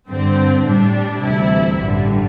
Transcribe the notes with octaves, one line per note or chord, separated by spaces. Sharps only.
G2 D3 C4
A2 G3 D4
D2 C3 E3 G3 E4
A1 G2 D3 G3